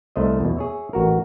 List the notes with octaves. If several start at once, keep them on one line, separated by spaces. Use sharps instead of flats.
C2 A3 C5 D#5
E2 B2
G#4 C#5 E5
A1 F#4 A#4